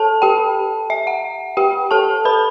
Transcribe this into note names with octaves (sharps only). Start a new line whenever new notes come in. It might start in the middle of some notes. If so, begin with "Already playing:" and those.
Already playing: A4 A5
G4 G5
E5
F#5
G4 G5
A4 A5
B4 B5